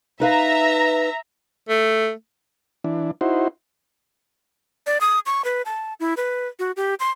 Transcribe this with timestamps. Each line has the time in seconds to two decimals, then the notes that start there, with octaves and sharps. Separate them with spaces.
0.20 D#4 B4 E5 F5 A#5
1.69 A3
2.84 E3 D4
3.21 D#4 E4 F#4 C5
4.86 D5
5.01 D#6
5.26 C#6
5.45 B4
5.66 A5
6.00 E4
6.17 B4
6.59 F#4
6.77 G4
7.00 C6